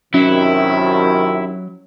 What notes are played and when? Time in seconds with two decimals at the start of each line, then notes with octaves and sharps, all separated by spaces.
0.14 F#2 C3 D#3 F#3 C#4 E4